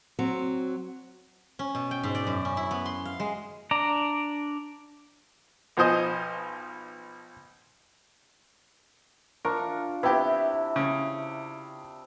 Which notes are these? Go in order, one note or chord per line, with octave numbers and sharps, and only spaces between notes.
F#3 C4
C#4
B2
G5
G#2
D5
F#2
C#4
E4
B3
C6
F5
G#3
D4 D5 A#5
B1 F3 C5 D#5 G#5
D4 F4 A#4 C#6
C3 B3 E4 G4
C#3